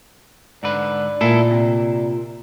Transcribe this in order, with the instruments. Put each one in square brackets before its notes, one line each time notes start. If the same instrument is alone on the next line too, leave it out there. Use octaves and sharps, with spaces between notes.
[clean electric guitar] G#2 D3 B4 [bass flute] D5
[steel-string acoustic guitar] A#2 [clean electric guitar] E4 G#4 A4
[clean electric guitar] C3